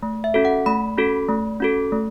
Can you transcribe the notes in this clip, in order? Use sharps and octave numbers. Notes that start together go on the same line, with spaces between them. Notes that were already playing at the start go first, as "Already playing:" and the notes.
A3
E5
C#4 F#4 A4
F#5
A3 B5
C#4 F#4 A4
A3
C#4 F#4 A4
A3